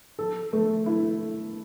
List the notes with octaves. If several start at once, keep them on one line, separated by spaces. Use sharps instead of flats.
A4
A3
E4